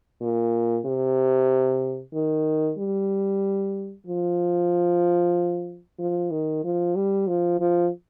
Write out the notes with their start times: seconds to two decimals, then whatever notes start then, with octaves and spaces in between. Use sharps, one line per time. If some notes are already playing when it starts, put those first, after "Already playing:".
0.21 A#2
0.86 C3
2.14 D#3
2.78 G3
4.07 F3
5.99 F3
6.31 D#3
6.64 F3
6.96 G3
7.28 F3
7.60 F3